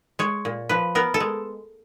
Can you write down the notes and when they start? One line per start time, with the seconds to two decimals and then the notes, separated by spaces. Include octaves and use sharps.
0.19 G#3 C#5
0.45 A#2
0.69 F3 B4
0.95 B3 A#4
1.14 A4
1.20 G#3